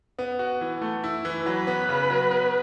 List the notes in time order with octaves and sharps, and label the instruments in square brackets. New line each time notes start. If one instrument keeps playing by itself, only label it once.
[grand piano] B3
F#4
E3
A3
E4
E3
[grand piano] F#3 [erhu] B4
[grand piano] B3
C#3
F#3
B3